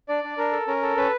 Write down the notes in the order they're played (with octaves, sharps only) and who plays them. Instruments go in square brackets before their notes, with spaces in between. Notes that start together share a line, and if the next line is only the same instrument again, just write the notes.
[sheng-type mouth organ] D4 D5
D4
D4 A#4
A4
C#4 A#4
A4
C#4 B4